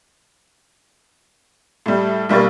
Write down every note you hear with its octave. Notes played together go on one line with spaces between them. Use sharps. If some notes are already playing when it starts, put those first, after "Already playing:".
A2 G3
B1 G3 A#3 C#6 A6